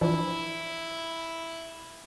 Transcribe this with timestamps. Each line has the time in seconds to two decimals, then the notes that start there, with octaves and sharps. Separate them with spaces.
0.01 E3 F3 D4 E4